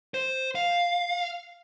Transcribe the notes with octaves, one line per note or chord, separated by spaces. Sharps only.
C5
F5